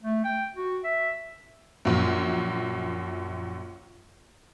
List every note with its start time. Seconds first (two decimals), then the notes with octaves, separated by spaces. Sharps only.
0.03 A3
0.24 G5
0.55 F#4
0.84 E5
1.85 A#1 F#2